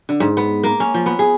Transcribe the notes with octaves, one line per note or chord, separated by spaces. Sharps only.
D3
G#2
B3
A#3
C#4
F3
B3
G#4